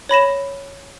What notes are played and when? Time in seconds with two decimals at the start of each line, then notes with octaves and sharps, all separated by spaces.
0.09 C#5 B5 A#6 E7